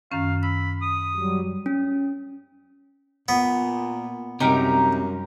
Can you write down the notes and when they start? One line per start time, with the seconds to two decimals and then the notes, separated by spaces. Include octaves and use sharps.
0.12 F#2 D#3 C#4 F5
0.43 B5 E6
0.82 D#6
1.16 F#3 G3
1.66 C#4
3.28 A#2 B3
4.40 C2 F#2 C3 D#4 G4 A#4